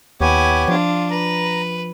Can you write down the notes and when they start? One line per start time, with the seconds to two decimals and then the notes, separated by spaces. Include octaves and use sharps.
0.21 D#2 B3 E4 G4 C#5 G#5
0.68 F3 D4 F4
1.11 B4 A#5